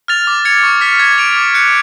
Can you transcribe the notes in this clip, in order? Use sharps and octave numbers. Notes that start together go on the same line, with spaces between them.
F6 A6 F7
D6
G#6 C#7 F7
C#6
F6 B6
G#6
D7 F7
D6
F#6 C#7